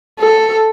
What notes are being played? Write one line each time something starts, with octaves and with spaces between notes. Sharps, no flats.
A4